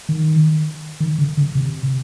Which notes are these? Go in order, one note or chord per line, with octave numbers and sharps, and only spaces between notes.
D#3
D#3
D3
D3
C3